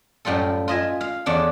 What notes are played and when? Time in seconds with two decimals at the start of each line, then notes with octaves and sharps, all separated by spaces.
0.25 F#2 A2 G3 F4 A4
0.68 F4 D#5 E5 G#5
1.01 F5
1.26 E2 C#4 D4 A4